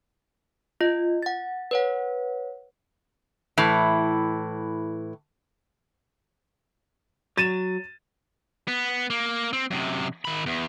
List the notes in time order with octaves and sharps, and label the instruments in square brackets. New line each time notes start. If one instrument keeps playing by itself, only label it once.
[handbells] F4 D#5
F#5 A6
B4 C#5 F#5
[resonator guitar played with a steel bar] A2 E3
[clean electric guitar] F#3 [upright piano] A6 D#7 E7
[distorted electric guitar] B3
A#3
C4
F#2 C3
D#3 B5
E2